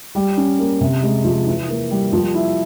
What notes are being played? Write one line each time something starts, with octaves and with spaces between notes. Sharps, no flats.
G3
C#4
A#3
C3
G#3
F3
E3
A#3
G3
F3
E4